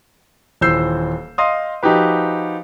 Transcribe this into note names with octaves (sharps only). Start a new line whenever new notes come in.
D#1 E3 C5 E6 G6 C7
D#5 F5 C6 D#6
F3 D#4 F#4 G4 B4